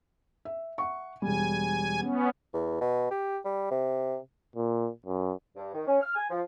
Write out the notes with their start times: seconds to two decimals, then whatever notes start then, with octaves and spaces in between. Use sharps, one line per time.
0.45 E5
0.78 E5 F#5 C#6
1.22 E1 G3 G#5
2.00 B3 C#4
2.54 E2
2.81 B2
3.11 G4
3.45 G3
3.71 C3
4.56 A#2
5.06 F#2
5.56 G2
5.73 D#3
5.87 C#4
6.01 F6
6.15 G#5
6.30 F3